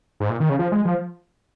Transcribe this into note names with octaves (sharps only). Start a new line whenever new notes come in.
G#2
A#2
D#3
C#3
F3
G#3
F3